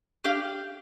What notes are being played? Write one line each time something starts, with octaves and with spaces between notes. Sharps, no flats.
D4 G4 F5